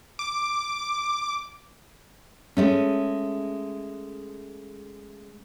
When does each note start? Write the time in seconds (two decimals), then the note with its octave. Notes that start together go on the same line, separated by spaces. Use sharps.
0.19 D6
2.57 G#3 A3 C#4